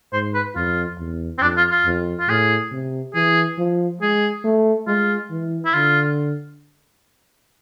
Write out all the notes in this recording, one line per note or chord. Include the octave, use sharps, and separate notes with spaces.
G#2 C5
B4
F2 F4
E2
C4
F2 D4
F4
F4
F2
F4
A2 G#4
C3
E3 G#4
F3
G#3 G#4
A3
G#3 F4
E3
E4
D3 F4